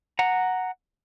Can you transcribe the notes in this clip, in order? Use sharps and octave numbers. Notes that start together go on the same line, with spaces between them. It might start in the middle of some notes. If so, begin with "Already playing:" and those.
F#5 A#5